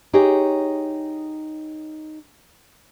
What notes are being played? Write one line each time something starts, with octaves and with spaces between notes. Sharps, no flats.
D#4 G4 G#4 C#5